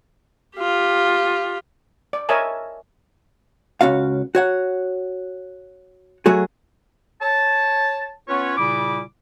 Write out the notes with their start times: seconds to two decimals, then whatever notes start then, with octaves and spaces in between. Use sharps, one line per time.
0.58 F4 G4
2.13 D5
2.29 A#4 C#5 D#5 E5 G#5 A5
3.81 C#2 C#4 F#4 F5
4.35 F#4 C#5 F#5
6.26 F#3 A3 F#4 G#4
7.21 C#5 A5
8.28 B3 C#4 F4 B4 C#5
8.58 A#2 C#3 G3 E4 D6